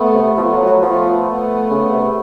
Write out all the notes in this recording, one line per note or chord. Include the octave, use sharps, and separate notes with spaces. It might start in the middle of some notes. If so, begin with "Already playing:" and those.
Already playing: A3 B3
C3
F3 A3 B3
F#3
F#3
F3 A3 B3
A3 B3
C#3
C3